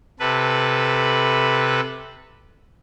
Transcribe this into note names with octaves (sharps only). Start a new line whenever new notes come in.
C3 A4 B4